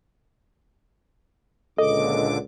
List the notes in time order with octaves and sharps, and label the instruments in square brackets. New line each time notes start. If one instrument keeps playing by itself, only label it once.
[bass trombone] C#2 [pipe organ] A#2 D3 D6 [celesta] A4 [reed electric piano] D#5